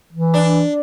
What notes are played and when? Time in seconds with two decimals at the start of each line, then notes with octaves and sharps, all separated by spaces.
0.13 E3
0.34 D4